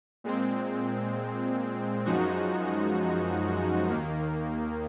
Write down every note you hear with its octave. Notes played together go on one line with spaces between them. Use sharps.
A#2 G#3 C4
F#2 F3 G#3 D#4 F#4
D#2 D#3 A#3